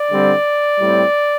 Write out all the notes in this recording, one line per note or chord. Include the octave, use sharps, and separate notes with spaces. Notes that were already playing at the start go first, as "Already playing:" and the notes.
Already playing: D5
D3 G3 C4
A2 G3 C4